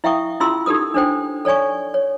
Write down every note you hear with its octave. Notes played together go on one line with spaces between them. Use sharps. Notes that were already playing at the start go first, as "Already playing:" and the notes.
E4 E5 F5 G5 C#6 D#6
C#4 E4 F4 G#4 C6 E6
D#4 G4 A4 A#4 D#6
D4 A4 C5 G5
A4 C#5 D5 G#5 C#6
C#5